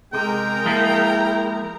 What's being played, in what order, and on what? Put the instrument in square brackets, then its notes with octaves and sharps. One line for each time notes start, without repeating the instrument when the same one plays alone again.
[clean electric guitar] C3 [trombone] G#3 [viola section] G#4 A#4 A#5 [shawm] G5
[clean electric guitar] F3 G#3 A#3 [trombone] E4